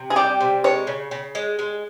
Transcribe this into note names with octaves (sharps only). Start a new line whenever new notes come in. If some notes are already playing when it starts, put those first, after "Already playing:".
Already playing: C3
G#4
G3 G4
C3
G#3 C#5
C#3
C#3
G#3
G#3